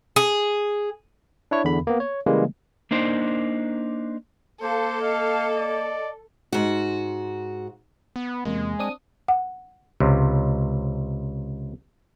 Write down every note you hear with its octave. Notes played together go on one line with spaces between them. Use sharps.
G#4
D4 E4 C#5
E2 D3 B5
A#3 B3
C#5
C#3 E3 G3 G#3 A#3
A#3 D4 D#4 C5
A#3 A4 C5 F5
D#5 F5
D5
G#2 F#4
B3
E2 C3 G#3 A#3
C4 D4 D#6
F#5
C#2 C3